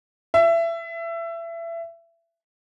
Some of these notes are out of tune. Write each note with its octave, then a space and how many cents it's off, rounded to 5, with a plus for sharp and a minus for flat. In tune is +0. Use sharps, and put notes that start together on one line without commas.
E5 +25